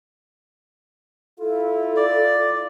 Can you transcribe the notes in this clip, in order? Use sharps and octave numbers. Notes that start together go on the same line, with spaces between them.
E4 F4 A4
D5